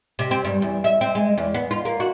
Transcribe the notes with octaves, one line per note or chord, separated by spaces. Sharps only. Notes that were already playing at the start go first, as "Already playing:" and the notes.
C3
C4
G2
E2
E5
C4
G#3
E2
B3
F4
A#3
F#4